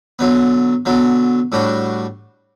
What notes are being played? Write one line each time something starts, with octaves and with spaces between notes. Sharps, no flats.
D3 F#3 B3
D3 F#3 B3
A2 G3 D4 F#4